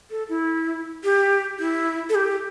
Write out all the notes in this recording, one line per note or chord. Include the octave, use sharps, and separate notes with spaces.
A4
E4
G4
E4
A4
G4